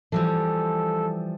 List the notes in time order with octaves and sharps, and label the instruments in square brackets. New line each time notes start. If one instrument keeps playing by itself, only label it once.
[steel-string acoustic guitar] E3 F3 G3 [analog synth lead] A4